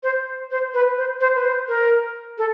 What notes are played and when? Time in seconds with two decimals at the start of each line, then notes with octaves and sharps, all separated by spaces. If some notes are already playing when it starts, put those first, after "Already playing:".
0.03 C5
0.51 C5
0.74 B4
0.97 C5
1.21 C5
1.35 B4
1.44 C5
1.68 A#4
2.38 A4